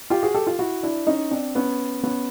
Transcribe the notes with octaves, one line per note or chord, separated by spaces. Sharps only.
F4 G4
F#4 G#4
G4 A4
F4 G4
E4 F#4
D4 E4
C#4 D#4
C4 D4
B3 C#4
B3 C#4